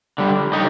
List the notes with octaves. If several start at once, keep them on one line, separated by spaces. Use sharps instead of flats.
D3 G3
D3 D#4 G4